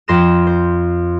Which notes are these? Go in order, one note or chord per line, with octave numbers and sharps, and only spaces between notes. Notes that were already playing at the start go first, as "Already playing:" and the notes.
F2 C6 A#6 E7
C5